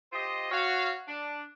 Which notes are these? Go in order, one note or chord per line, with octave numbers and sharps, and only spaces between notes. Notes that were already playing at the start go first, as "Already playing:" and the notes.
F4 G4 C5 D#5
F#4 C#5 F5
D4